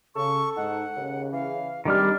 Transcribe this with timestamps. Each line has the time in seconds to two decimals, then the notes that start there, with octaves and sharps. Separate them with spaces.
0.16 C#3 A4 C#6
0.56 G#2 D#4 F#5
0.97 D#2 C#3
1.32 E3 F5
1.85 C3 D#3 G3 G#3 D4 D#4 G4 F6